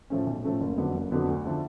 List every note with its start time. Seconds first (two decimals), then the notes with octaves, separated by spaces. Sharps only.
0.10 A2 F3 A3 C#4
0.27 B1
0.44 A2 F3 A3 C#4
0.61 F#1
0.77 F2 D3 F#3 B3
0.94 F#1
1.11 F2 D3 F#3 B3
1.28 D2
1.46 D3 F3 A3